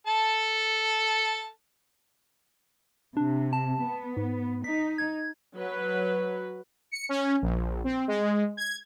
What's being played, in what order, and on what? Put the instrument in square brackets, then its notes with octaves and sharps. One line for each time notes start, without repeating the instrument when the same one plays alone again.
[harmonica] A4 A5
[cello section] C3 [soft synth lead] D4
[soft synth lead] A5
[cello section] B3
[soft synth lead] G#2
[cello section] D#4 [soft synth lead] B6
[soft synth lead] G#6
[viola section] F#3 B4
[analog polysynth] C#7
C#4
A#1
C4
G#3
G#6